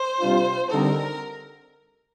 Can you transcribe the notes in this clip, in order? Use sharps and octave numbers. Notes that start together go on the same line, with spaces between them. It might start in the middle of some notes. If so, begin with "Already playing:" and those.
Already playing: C5
C3 G3 D4 F4
D3 G3 C4 D#4 A4 A#4